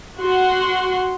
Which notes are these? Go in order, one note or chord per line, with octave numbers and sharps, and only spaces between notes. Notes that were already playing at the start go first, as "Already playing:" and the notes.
F#4 F#5 C6